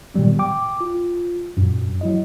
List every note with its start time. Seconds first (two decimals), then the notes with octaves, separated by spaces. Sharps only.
0.14 A#2 D#3 F#3 G3 B3
0.39 G5 D6
0.81 F4
1.57 F#2 A#2
2.01 F#3 E4 D#5